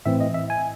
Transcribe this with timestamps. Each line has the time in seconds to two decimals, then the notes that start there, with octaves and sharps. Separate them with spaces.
0.06 A2 E3 C4 E5
0.20 D#5
0.34 E5
0.50 G#5